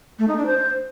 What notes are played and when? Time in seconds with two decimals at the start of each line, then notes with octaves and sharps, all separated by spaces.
0.19 A3
0.28 D#4
0.37 D4
0.46 C5